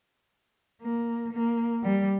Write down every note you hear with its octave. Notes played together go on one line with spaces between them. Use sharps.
A#3
A#3
G3